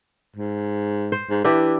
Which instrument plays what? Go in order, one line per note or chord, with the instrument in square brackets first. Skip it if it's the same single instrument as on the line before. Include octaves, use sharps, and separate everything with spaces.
[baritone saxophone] G#2
[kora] C5
[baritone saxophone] G#2
[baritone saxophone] E3 [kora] D4 E4 G4